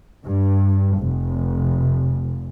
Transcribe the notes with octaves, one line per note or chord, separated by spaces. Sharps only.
G2
F1